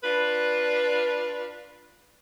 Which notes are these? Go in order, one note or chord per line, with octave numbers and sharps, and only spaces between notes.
D4 F4 B4